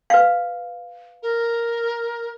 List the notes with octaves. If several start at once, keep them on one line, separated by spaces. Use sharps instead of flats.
B4 F5
A#4